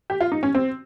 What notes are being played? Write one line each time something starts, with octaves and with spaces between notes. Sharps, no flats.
G4
F4
D#4
C#4
C4